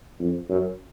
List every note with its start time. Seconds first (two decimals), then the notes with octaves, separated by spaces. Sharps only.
0.19 F2
0.49 F#2